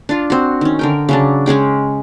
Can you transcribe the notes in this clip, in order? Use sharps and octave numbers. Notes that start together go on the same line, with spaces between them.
D4 F4
C4 F#4
D#3 C#4
D3 A#4 G5
C#3 F#3 D4
G#3 C#4 G#4 G5